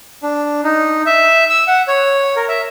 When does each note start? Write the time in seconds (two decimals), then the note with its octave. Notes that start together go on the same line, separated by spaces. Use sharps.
0.23 D4
0.64 D#4
1.06 E5
1.50 E6
1.67 F#5
1.88 C#5
2.36 A#4
2.48 E5